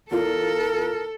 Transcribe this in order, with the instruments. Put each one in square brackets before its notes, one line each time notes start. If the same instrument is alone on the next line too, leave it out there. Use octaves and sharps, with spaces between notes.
[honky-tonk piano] E2 F4 [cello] A4 [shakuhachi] A#4